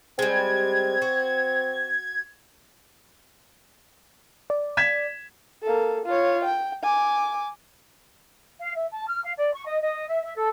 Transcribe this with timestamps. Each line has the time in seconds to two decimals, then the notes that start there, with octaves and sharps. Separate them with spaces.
0.19 G3 G#3 C4 G#6
1.02 F#4
4.50 D5
4.77 G#6 B6 E7
5.63 A#3 A4
6.06 F4 C#5
6.44 G5
6.83 G#5 D6
8.59 F5
8.75 E5
8.90 A5
9.06 F6
9.23 F5
9.36 D5
9.53 C#6
9.65 D#5
9.80 D#5
10.08 E5
10.22 E5
10.35 A4